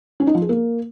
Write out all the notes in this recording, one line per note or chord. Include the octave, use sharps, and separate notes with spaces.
C#4
D#4
F3
G#4
A#3